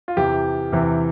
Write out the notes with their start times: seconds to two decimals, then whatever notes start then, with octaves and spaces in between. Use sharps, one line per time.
0.08 F4
0.17 E2 C3 E3 G4
0.72 E2 C3 E3